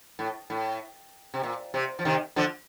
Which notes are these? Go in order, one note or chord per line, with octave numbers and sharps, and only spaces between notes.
A2
A2
C3
A#2
C3
F3
C3 D#3
D3 F3